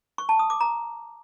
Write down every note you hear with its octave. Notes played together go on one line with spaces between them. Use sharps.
C#6
A5
D#6
D6
A#5